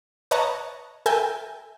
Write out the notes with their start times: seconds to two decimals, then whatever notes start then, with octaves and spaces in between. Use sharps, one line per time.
0.31 B4 C#5 D#5 A5 A#5 C#6
1.06 A4 A#4 E5 G5 G#5